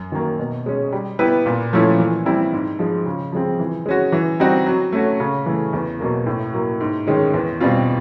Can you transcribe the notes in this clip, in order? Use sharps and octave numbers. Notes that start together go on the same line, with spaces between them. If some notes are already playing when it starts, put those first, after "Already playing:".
Already playing: F#2
D#3 F#3 A#3
B2
G#3 C#4
G3
B3 E4 G4 B4
A#2
F3 A3 C#4 E4
E3
G3 C4 E4
G#2
F3 G#3
C#3
F3 G#3 C4
E3
G#3 C#4 F#4
E3
G3 C4 D#4 F#4
F#3
A3 C#4 F#4
C#3
E3 A3
E2
B2 F#3 A#3
A2
F#3 A#3
G#2
D#3 G#3 C#4
E2
B2 G3 C4 F4